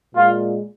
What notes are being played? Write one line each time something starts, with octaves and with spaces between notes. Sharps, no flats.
A#2 G#3 F4